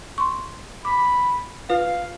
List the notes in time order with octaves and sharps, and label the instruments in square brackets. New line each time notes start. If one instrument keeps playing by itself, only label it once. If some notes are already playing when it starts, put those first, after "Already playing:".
[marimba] C6 C#6
[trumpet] B5 [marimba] D6
[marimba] F4 B4 [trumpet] F5